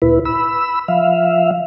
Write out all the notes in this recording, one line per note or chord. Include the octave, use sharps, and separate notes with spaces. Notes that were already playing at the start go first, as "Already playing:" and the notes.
D2 A#2 E4 B4
B5 E6
F3 E5 F5